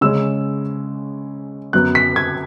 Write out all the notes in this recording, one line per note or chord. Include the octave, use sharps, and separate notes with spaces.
C#3 G#3 C#4 E6
F#2 F#3 B3 F#6
B6
G#6